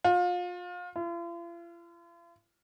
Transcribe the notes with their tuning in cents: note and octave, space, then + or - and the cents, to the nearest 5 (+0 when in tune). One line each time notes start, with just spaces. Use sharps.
F4 +30
F4 -45